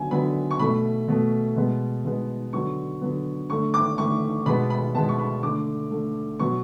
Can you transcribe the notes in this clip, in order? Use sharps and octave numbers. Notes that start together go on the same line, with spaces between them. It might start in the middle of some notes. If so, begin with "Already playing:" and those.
Already playing: D3 F#3 B3 G#5
D3 F#3 B3 B5
C#6
B2 A3 B5
B2 A3
B2 G#3 B3
B2 G#3 B3
D3 F#3 B3 C#6
D3 F#3 B3
D3 A3 C#6
D6
D3 A3 C#6
B2 G#3 B3 B5
B5
B2 G#3 B3 A5
C#6
B5
D3 A3 D6
D3 A3
B2 F#3 B3 C#6